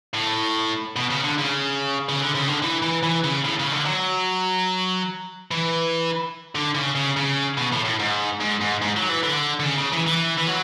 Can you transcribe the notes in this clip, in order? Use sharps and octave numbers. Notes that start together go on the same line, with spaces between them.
A2
B2
C#3
D3
C#3
C#3
D3
C#3
D3
E3
E3
E3
C#3
A2
C#3
D3
F#3
E3
D3
C#3
C#3
C#3
B2
A2
A2
G#2
G#2
G#2
G#2
F#3
E3
D3
D3
C#3
C#3
E3
E3
E3
F#3